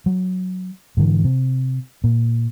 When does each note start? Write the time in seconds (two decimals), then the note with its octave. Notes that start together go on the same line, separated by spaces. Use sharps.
0.06 F#3
0.97 G#2 D3 E3
1.24 C3
2.04 A#2